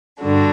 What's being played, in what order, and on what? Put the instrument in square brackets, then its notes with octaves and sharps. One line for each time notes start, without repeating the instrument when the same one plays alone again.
[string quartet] G2 D3 D4 F#4